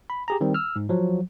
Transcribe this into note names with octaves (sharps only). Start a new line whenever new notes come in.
B5
G4 G#4 A#5
D#3 G3 C4
E6 F6
G#2
F3 F#3